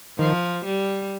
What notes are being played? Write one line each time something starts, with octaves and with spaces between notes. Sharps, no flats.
D#3 F3
G3